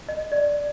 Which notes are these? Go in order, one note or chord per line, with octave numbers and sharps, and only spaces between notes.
D#5
D5